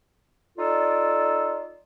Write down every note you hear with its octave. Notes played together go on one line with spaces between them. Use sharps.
D#4 F4 A4 D5